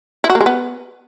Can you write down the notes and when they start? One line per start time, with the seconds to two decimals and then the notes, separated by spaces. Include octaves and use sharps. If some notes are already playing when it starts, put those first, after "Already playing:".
0.24 E4
0.30 F#4
0.35 A#3
0.41 G#3
0.46 B3